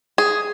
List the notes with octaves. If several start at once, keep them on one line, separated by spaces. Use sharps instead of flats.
G#4